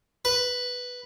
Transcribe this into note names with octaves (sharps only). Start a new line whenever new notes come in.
B4